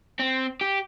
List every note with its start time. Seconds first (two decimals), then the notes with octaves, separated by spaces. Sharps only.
0.19 C4
0.61 G4